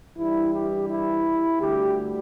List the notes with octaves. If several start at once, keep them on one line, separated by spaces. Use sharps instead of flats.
G2 E3 G3 E4
G4
E4
D2 D3 G3 G4